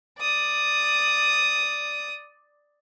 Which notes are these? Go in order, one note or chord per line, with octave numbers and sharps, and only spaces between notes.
D5 D#6